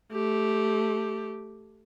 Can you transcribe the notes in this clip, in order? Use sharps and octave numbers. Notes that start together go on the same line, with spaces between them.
A3 G4